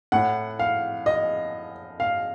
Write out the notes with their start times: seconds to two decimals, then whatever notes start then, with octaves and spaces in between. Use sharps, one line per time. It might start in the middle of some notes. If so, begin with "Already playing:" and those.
0.12 A2 F#5
0.59 F5
1.06 D#5
2.00 F5